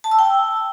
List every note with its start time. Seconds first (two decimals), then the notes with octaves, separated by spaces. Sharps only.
0.04 A5
0.11 E6
0.19 G5